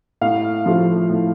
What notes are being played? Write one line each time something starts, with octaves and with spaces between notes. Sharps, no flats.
A2 F5
F3 A3
A2